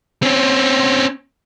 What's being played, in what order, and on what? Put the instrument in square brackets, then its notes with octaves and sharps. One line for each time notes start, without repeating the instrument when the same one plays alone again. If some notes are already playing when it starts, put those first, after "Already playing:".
[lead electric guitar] C4 C#4